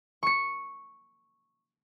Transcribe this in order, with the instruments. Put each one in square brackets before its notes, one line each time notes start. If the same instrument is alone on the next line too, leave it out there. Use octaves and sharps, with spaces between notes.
[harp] C#6 C#7